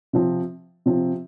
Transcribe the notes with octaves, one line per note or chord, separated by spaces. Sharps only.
C3 F3 C4
C3 F3 C4